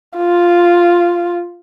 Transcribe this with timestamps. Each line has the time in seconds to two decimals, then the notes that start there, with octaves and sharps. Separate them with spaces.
0.17 F4